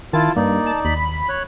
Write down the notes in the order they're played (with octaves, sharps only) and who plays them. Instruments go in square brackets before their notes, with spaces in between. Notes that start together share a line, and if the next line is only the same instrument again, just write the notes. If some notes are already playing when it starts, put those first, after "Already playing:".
[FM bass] D#3 [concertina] E4 F4 [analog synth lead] A5
[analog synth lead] G2 [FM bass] A#3 [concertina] D#4 D5
[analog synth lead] A5
[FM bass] D#2 [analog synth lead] B5
[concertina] C#5 F#6